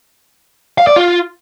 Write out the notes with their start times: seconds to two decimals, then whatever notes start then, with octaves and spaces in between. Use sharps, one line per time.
0.78 F5
0.87 D5
0.96 F4